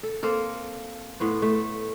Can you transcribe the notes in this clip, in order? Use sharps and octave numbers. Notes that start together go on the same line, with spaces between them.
A4
A#3 C4 A4 A#4
A2 B3 C5
A3